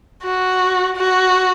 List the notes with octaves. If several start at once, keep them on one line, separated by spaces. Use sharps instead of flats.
F#4
F#4